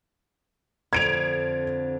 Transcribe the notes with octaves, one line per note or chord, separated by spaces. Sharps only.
F2 D3 G#6 D7 F7